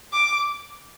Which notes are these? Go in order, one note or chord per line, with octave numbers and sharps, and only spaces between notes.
D6